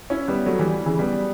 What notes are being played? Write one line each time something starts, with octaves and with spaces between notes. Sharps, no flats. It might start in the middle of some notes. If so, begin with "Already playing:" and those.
C#4 E4
G3 B3
F#3 A3
E3 G3
C#3 E3
G3 B3